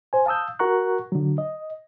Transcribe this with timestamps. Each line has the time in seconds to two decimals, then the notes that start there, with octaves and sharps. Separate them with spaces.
0.13 C5 G#5
0.26 F5 A5 D#6 E6 G6
0.59 F#4 A#4 F#5 A#5 C#6 F#6
1.12 D3 F#3
1.38 D#5